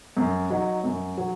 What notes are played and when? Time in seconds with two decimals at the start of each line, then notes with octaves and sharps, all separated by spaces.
0.17 F#2
0.50 F#3 D#4
0.84 F#2
1.18 F#3